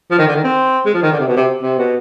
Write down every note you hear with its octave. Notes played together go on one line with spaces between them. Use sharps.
F3
D#3
D3
D#3
C4
G#3
F3
D#3
D3
C3
B2
C3
C3
B2